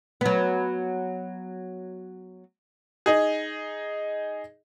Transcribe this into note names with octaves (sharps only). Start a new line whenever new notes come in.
F#3 B3
D#4 G#4